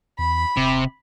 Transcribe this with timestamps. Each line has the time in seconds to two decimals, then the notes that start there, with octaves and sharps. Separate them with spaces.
0.19 E2 B5
0.57 D#1 C3